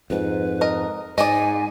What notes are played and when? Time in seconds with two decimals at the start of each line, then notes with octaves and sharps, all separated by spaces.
0.10 F2 G#2 B4
0.61 A#4 D#5
1.18 G#2 D5 D#5 G#5